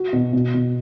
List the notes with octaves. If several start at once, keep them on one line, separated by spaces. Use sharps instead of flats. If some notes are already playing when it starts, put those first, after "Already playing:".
Already playing: F#4
B2
B2
B2